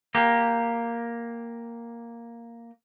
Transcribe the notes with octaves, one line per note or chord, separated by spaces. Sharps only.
A#3 G4